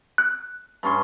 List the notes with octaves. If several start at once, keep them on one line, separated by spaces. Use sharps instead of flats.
F#6
G2 C#4 C6